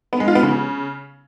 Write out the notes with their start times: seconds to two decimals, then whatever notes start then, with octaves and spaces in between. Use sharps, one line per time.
0.13 B3
0.20 G#3
0.28 F4
0.35 B3
0.43 C#3